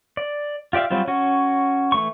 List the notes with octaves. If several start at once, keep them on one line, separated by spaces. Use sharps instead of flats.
D5
F4 G4 D5 E5 F5
F#3 G3 C4 F4
C#4 F#4
E3 A3 C#6